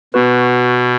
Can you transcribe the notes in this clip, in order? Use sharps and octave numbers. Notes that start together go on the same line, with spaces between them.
B2 B3 F#4 B4